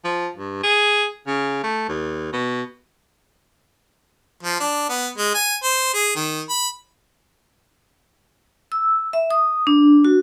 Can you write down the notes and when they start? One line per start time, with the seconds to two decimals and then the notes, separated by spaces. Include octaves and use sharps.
0.05 F3
0.37 G2
0.63 G#4
1.27 C#3
1.64 A3
1.89 D#2
2.33 B2
4.43 F3
4.60 D4
4.89 B3
5.18 G#3
5.34 G#5
5.63 C5
5.94 G#4
6.16 D#3
6.49 B5
8.72 E6
9.13 E5
9.31 D#6
9.67 D4
10.05 F#4